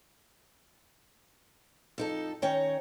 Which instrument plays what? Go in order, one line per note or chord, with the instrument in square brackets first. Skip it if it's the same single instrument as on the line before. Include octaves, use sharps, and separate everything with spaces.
[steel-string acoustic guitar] F2 D#4 A4
D#3 C#4 C#5 G5 A#5